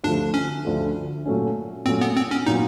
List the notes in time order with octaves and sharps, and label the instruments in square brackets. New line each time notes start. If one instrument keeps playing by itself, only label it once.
[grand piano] D2 D3 F3 A3 [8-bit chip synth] D4
[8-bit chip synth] C#4
[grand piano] D2 D3 F3 A3
A#2 F#3 A3 C#4
[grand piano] A#2 F#3 A3 C#4 [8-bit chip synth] C4
[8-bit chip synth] B3
C4
C#4
[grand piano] A#2 F#3 B3 [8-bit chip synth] D#4